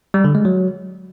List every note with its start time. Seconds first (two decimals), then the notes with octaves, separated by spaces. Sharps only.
0.14 G3
0.24 D3
0.35 G#3
0.45 F#3